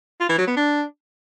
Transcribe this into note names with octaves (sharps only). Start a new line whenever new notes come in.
F4
E3
F#3
B3
D4